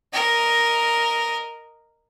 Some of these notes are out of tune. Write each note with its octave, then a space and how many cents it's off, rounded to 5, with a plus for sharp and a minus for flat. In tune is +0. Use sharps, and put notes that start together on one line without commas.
A#4 +0 D#5 +0